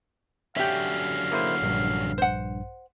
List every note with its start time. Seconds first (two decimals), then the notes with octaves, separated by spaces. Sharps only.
0.56 D3 F#3 C#4 G4 E5 F5
1.32 A#3 E4 G#4 C5
1.63 A#1 G2
2.18 C5 F#5